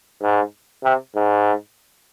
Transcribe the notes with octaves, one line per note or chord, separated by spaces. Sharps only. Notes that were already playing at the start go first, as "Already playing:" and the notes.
G#2
C3
G#2